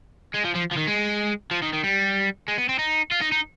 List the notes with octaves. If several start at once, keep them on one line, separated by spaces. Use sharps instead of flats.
G#3
F3
F3
F3
D#3
G#3
F3
D#3
D#3
G3
G#3
B3
C4
D#4
F4
D#4
D#4